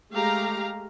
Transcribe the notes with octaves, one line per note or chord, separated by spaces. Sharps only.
G#3 A3 G4 F5 A#5